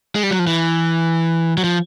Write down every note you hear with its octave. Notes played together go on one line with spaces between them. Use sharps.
G#3
G3
F#3
F3
E3
F#3
F3